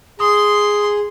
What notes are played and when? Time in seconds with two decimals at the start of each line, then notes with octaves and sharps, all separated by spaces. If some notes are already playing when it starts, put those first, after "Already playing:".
0.20 G#4 C6 D#6